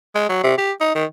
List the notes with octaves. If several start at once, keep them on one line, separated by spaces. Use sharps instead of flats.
G#3
F#3
C3
G4
D#4
D#3